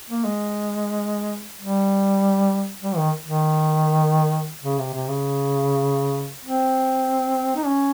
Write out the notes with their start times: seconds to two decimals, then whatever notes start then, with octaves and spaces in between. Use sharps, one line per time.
0.10 A#3
0.25 G#3
1.60 G3
2.82 G3
2.97 D#3
3.27 D#3
4.63 C#3
4.79 C3
4.94 C3
5.09 C#3
6.45 C4
7.56 D#4
7.66 C#4